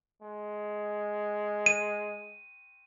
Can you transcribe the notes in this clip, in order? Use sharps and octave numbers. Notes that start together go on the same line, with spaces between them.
G#3
D#7